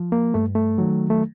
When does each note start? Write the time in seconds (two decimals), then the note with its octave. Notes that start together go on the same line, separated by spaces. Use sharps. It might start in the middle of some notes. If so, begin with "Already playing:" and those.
Already playing: F3
0.12 A#3
0.34 G2 A3
0.55 A3
0.78 D#3 F#3
1.10 A3